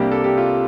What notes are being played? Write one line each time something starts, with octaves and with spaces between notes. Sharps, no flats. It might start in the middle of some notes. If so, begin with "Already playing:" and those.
Already playing: C2 C3 G3 A#3 D4 G4
A4
G4
F4